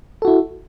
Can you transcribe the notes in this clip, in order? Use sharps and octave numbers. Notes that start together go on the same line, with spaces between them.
E4 F#4 A4